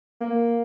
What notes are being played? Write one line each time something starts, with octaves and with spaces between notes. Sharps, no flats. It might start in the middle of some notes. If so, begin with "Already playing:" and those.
A#3